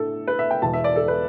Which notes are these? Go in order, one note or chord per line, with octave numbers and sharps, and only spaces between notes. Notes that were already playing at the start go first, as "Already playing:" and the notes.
Already playing: A2 A3 D4 A4
B4
E5
G5
E1 E2 B2 A5
E5
D5
A4
B4